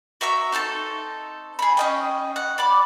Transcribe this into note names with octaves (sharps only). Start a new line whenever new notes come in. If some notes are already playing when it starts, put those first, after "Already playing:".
F#4 E5 A#5 E6
C4 D#4 A4 A5
G#4 B5
C#4 D#5 G5
F#5
D5 B5 D6